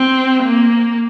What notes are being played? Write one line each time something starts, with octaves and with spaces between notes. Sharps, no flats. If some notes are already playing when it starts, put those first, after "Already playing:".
Already playing: C4
A#3